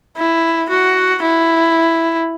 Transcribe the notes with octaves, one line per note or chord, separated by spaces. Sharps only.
E4
F#4
E4